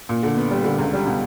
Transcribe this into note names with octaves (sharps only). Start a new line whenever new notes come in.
A#2
D3
B3
G3
D3
C#2
G3
B2